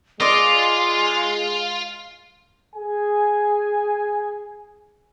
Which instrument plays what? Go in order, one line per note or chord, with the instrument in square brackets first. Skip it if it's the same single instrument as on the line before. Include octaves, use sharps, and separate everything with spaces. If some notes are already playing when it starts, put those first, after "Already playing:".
[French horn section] G#3 [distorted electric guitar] F4 [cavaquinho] D5 D#5 [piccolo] C6
[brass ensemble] G#4 G#5